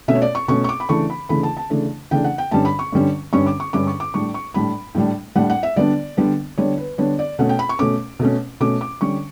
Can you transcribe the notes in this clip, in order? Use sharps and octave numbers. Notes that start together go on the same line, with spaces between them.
B2 A3 C#4 E5
C#5
D5
C#6
B2 A3 C#4 C#6
C#6
D6
B5
C#3 E3 A3 D4 C#6
B5
C#3 E3 A3 D4 B5
A5
A5
C#3 E3 A3 D4
C#3 E3 A3 D4 G5
F#5
G5
G2 D3 G3 C#4 A5
B5
C#6
G2 D3 G3 C#4
G2 D3 G3 C#4 C#6
D6
C#6
G2 D3 G3 C#4 D6
C#6
D6
A2 G3 D4 C#6
C#6
A2 G3 D4 B5
A2 G3 D4
A2 G3 D4 F#5
F#5
E5
D3 G3 B3 D4 D5
D3 G3 B3 D4
D3 G3 B3 D4 C#5
B4
D3 G3 B3 D4 C#5
D5
B2 A3 C#4 F#5
G5
B5
C#6
B2 A3 C#4 D6
B2 A3 C#4
B2 A3 C#4 D6
D6
D3 G3 C#4 C#6